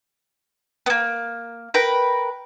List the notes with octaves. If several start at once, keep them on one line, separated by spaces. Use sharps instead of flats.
A#3 B3
A#4 B4 G5 B5